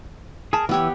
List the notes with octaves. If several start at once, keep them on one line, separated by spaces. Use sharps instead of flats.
G#4 A#4 A5
E3 B3 G4 C#5 E6